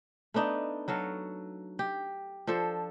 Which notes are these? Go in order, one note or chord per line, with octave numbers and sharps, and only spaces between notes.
A3 B3 D4 D#4
F#3 F#4 A4 F5
G4
F3 D4 A4 C5